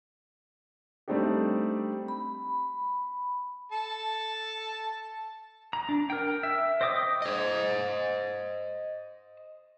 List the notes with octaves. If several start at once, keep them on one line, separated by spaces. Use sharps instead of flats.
G3 A3 C4 D4 D#4 G4
B5
A4 A5
A#5
D4
A#4 G5
E5
C5 D#5 G5 D6 D#6
C5 D#5